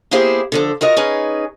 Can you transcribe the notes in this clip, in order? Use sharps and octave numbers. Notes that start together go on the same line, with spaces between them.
A#3 B3 E4 G4 G#4 C5
D3 F3 A4
F4 F#4 A#4 D#5
C#4 D#4 G#4 B4